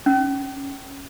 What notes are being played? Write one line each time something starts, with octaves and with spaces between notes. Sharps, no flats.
C#4